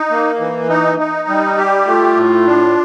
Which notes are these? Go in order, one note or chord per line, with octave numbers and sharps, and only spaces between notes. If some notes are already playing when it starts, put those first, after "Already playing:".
Already playing: D#4
A#3
E3
D#4
D#4
G3
G4
A3 F4
A2
D4